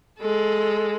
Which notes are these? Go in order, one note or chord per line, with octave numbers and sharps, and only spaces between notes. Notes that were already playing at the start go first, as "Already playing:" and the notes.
G#3 A4